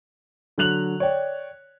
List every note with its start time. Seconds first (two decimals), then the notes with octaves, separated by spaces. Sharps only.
0.58 D3 F#3 F#6 F7 F#7
1.00 C#5 D5 G5